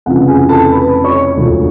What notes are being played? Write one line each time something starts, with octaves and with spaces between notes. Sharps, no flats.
F1 F2 C#3 E3 F#5
G#4 G#5
A4 A5
B4 B5
C#5 C#6
E1 D2 D3 F3